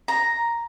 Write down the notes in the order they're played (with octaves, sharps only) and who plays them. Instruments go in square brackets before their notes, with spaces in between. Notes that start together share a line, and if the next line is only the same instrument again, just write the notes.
[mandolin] A#5